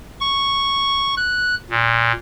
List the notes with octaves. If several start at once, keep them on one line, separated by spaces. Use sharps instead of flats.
C#6
F#6
A#2